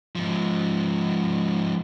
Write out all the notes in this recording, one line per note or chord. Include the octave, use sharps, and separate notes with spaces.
G#2 F3